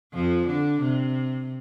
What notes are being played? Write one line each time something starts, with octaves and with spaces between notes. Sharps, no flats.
F2 F3
D3 D4
C3